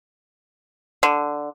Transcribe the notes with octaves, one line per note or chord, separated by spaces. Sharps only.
D3